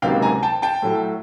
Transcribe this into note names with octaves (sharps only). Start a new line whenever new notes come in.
C#2 C3 D#3 F#3 A#3 F5 G5
G#5 A#5
G5 A5
G5 A5
A2 F#3 A3